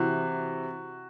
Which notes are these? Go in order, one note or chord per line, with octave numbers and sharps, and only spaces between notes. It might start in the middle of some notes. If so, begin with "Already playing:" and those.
Already playing: C3 E3 F#4